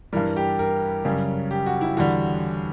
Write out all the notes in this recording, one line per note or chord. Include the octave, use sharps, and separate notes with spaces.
G2 E3 G3 A#4
G4
A#4
F#2 C#3 G3
G4
F#4
E4
E2 D3 G3 F#4